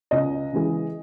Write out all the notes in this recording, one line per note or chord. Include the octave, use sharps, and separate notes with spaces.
C#2 D#5
C#3 E3 G#3